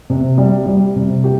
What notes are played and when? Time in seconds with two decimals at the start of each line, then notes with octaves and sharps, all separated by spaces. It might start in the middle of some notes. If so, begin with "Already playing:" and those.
0.10 C3
0.38 G3
0.66 G3
0.96 C3
1.24 G4